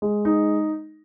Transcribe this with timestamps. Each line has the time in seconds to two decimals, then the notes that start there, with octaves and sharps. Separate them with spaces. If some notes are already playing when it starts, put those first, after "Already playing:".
0.02 G#3
0.25 D#4